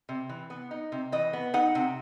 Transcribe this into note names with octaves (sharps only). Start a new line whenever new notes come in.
C3
E3
B3
D#4
C3
E3 D#5
B3
D#4 F#5
C3